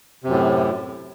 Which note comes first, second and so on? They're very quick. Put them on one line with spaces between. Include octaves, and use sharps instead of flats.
C3 F#2 A2